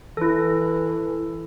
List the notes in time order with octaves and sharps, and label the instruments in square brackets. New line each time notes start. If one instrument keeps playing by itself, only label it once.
[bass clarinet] E3 [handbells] E4 A4